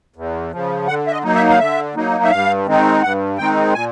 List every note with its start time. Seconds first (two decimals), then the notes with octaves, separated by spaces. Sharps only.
0.16 E2
0.52 C#3 F3
0.87 D3 F#5
1.07 E5
1.11 D#5
1.24 F#3 A#3 D#4
1.35 E5
1.50 F5
1.59 D3 E5
1.95 F#3 A#3 D#4
2.24 E5
2.31 G2 F5
2.66 D#3 G#3 C4 D#4
3.02 G2 F#5
3.38 D#3 G#3 C4 D#4 G5
3.74 A#2 G#5